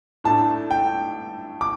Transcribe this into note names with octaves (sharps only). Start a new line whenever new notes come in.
A2 A3 D4 A5
G5
D6